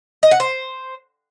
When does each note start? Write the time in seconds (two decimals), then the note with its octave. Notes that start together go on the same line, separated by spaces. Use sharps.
0.23 D#5
0.31 F#5
0.40 C5